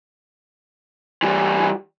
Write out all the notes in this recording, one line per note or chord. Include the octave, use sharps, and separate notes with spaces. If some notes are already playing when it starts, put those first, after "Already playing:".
E3 G3